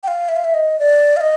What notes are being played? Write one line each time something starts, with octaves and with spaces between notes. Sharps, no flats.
G5
F5
E5
F5
E5
D#5
D5
F5
D#5